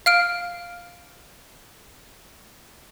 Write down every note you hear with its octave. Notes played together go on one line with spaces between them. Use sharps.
F5 F6 D7